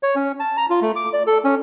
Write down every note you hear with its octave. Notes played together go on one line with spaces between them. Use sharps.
C#5
C#4
A5
A#5
F4
A3
D6
D5
A4
C#4